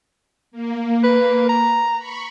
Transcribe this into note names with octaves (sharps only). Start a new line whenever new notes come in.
A#3
B4
A#5
B5 C#6